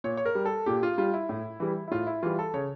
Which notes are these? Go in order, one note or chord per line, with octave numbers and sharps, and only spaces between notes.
A#2 C#5
C#5
A#4
G3
A4
A#2 G4
F4
G3 F4
E4
A2
E3 G3
E4
A2 F4
E4
E3 G3 F4
A4
C#3 C#5